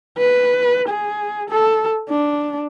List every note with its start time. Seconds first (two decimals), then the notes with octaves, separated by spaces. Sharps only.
0.18 B4
0.89 G#4
1.50 A4
2.09 D4